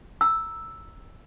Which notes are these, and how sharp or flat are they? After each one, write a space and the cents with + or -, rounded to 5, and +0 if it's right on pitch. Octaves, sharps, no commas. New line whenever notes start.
A#5 +0 E6 +0